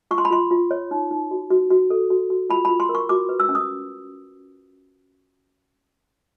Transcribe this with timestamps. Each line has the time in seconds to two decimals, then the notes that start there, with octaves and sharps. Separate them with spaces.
0.11 F4 C#6
0.18 C6
0.25 B5
0.30 F4 C6
0.51 F4
0.71 C#5
0.91 D#4
1.11 D#4
1.31 F#4
1.50 F#4
1.70 F#4
1.90 A4
2.10 F#4
2.30 F#4
2.50 F4 B5
2.65 F4 B5
2.80 C6
2.89 A#4
2.95 C#6
3.09 F#4 D6
3.29 B4
3.40 E6
3.49 C#4
3.55 D#6